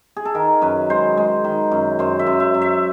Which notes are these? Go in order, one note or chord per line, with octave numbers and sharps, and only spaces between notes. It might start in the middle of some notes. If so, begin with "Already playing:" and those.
G#4
A4
D#3 A#4
F#2 B4
G#3 C5
G#3
D#3
F#2
F#2 C5
E5
F#2
E5
F#2
E5